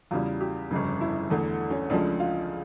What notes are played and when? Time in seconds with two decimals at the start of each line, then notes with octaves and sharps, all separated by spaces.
0.11 E2 C#3 G3 F4
0.41 G4
0.71 G1 F2 C#3
1.01 E4
1.30 E2 D3 A3
1.70 C#4
1.90 C#2 C#3 F3 A3 D4
2.20 F4